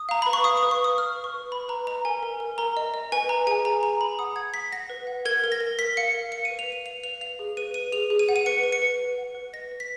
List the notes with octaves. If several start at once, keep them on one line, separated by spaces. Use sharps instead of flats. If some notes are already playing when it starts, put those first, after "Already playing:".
Already playing: D#6
F5 A#5
B4 B5
C#6
F5 D#6
D#6
B4
C#6
B4 D#6
B4 F6
B4
C#6
B4
B4 B5
B4 A#5
D#5 A#5
A#4 G#5
A#4
A#4
A#4 A#5
D#5
D#5
B4 G#5
B4 A#5
G#4 G#5
G#4 A#5
G#4 A#5
G#4 B5
F#5 D#6
F#5 G#6
F#5 B6
F#5 A#6
B4
F#5
A#4 G#6
A#4
A#6
A#4
A#4 B6
F5 C#7
A#4
F5 C#7
D#7
B4
F7
B4 D#7
F5 F7
B4 F7
F5 F7
G#4
B4 D#7
B4 D#7
G#4 F7
G#4
D#7
F#5
D#7
B4 C#7
B4
C#7
B4
B4
F#5
B4
D#5 A#6
B4
B6